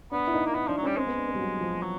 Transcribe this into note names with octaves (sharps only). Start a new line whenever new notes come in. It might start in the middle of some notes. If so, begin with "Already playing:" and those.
B3 D4
E4
D#4
A#3
B3 E4
F3 D4
F#3
G3 C#4
G#3 C4
B3
D4
C4
G3
F#3
F3
F#3